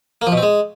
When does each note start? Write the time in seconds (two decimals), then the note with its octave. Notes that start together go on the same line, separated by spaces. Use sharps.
0.22 A#3
0.27 F3
0.32 B2
0.37 C4
0.43 G#3